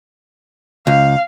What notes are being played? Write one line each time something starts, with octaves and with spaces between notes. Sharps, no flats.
C#2 F5